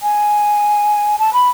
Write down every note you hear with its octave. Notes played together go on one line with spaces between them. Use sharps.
G#5
A5
B5